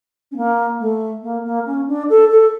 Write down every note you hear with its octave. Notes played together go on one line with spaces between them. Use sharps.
C#4
A#3
A3
A#3
A#3
C#4
D4
A4
A4